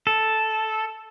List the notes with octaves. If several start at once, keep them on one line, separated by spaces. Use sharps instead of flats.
A4